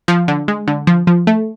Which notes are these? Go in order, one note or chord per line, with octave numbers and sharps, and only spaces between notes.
F3
D3
G#3
D3
F3
F3
A3